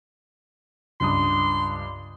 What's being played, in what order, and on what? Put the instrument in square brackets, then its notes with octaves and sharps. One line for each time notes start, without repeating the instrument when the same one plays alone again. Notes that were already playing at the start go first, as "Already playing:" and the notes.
[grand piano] C#2 G2 D#6 [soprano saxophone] C6